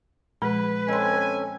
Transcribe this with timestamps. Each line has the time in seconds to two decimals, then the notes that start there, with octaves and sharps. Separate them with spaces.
0.42 A#2 F3 G#3 B4
0.89 C4 C#4 A4 D#5 G#5 C6